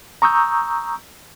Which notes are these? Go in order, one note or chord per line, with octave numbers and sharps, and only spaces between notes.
A#5 C#6 D#6 E6 G6